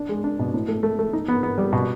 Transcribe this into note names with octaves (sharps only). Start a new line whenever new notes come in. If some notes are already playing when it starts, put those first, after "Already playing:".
Already playing: D4
G#3
D4
B2
A2
A3
A3
A3
D#4
B3
B3
G3
B2